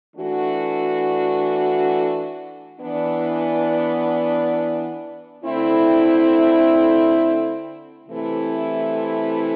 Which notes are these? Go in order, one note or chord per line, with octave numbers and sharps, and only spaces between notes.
E3 A3 D4 F#4
E3 B3 D4
D3 A3 C4 E4
C3 E3 A3 E4